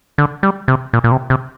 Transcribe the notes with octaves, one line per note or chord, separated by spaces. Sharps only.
D3
G3
C3
A#2
A#2
C3
C3